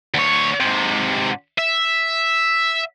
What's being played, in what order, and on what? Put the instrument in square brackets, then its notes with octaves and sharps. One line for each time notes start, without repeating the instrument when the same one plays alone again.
[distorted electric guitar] D2 C#5
G#2 C3
E5